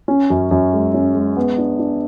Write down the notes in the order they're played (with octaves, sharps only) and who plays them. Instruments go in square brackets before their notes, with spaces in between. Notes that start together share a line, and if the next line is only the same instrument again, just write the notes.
[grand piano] C#4
F#2
F#2
G#3
C#4
G#3
B3
D4
D4